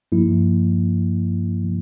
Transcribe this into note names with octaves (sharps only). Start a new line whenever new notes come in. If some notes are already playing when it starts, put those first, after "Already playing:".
G2 F3 A#3 E4